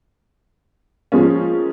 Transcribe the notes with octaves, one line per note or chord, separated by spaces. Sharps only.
F3 G#3 A#3 C#4